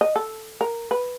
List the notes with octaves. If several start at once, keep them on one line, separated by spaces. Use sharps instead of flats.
D#5
A4
A#4
B4